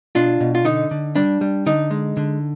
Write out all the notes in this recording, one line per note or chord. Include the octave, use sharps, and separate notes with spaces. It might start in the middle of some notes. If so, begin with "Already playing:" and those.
B2 D4 F4
B2
F4
D3 D#4
D3
G3 D4
G3
D3 D#4
G#3
D3